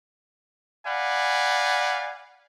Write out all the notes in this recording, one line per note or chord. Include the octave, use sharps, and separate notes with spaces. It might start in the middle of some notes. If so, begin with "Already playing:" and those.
D5 F5 F#5 G#5 B5